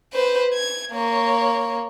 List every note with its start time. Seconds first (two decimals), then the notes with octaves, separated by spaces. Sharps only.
0.13 B4 C5
0.54 G#6
0.92 A#3 C#5